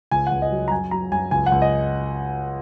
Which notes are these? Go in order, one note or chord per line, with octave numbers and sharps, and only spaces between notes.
C#2 G#5
F#5
C#2
D#5
F#3
A#5
F#2 G#5
F#3 A#5
F#2 G#5
C#2 G#5
F#5
C#2
D#5